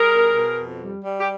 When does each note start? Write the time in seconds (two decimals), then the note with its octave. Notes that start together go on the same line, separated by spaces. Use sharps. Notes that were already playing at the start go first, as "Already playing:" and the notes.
Already playing: G3 G#4 A#4
0.11 B2
0.34 B2
0.57 F2
0.81 G3
1.04 G3
1.21 G4